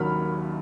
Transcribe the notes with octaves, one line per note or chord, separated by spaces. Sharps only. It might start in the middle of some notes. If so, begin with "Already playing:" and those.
Already playing: D#2 D#3 F#3 B5 F6